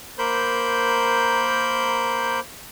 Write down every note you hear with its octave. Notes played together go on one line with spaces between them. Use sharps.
A#3 A#4 C5 B5 G6